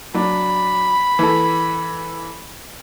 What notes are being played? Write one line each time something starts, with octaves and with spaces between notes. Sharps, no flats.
F#3 D4 B5
E3 A4